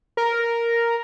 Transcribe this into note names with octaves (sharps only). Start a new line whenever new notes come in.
A#4